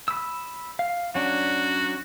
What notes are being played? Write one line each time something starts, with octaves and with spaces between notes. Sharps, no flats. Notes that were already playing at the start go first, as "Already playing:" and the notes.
B5 D#6 E6
F5
F#3 C#4 D4 F#4